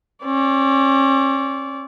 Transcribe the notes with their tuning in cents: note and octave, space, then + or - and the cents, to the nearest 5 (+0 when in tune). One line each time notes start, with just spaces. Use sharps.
C#4 -40 D5 -25